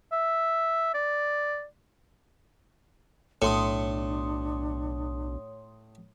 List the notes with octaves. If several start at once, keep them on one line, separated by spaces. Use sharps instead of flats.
E5
D5
B1 A2 D4 C#5 C6 D#6